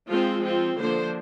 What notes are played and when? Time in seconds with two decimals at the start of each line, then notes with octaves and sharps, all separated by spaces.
0.09 F3 G#3 C4 F4
0.43 F3 C4 F4
0.78 D3 F3 A#3 D4 C5